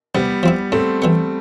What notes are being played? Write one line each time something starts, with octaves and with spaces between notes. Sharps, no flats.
C3 G3 B3
F3 C4 E4
A2 A3 C4
E3 G3 B3